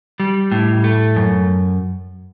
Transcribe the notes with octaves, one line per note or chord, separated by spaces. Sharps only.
G3
A2
A3
F#2